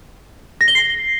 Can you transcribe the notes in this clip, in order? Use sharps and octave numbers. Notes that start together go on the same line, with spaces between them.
A#6
G7
C7